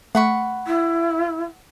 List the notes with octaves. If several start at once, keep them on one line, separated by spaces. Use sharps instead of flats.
A3 F#5 B5 C#6
E4